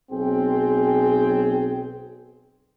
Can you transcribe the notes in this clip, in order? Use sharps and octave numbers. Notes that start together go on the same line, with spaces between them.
B1 C4 G#4 G5